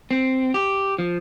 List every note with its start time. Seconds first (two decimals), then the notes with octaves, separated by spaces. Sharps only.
0.11 C4
0.54 G4
0.99 F3